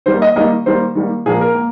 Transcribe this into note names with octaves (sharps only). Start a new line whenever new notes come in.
D#3 G3 A#3 C5
D#5
D#3 G3 A#3 D#5
D#3 G3 A#3 C5
D#3 G3 A#3
A#2 F3 A#3 G#4
A#4
A#3